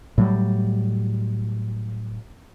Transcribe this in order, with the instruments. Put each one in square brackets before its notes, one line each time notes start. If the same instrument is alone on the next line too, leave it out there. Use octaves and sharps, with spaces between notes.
[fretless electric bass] A2 F#3 G3